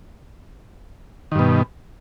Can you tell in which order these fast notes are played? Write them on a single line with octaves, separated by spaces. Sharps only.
D#3 G2 B2